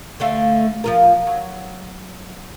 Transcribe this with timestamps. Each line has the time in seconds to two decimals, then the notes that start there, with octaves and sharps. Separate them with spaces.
0.20 D3 A3 F5
0.84 F3 F4 A#4
1.27 F#3